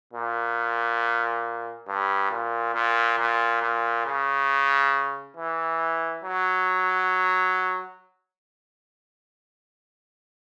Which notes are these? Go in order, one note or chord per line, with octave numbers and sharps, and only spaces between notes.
A#2
G2
A#2
A#2
A#2
A#2
C#3
E3
F#3